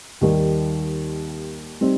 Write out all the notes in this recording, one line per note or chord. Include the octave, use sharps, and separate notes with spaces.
D#2 D#3 G3
G3 C4 D#4